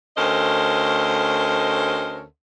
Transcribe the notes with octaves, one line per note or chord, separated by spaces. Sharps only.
D2 C#4 A4 A#4 C5 D#5